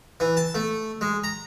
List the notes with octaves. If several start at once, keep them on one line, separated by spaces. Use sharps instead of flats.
E3
A5
A3
G#3
A#5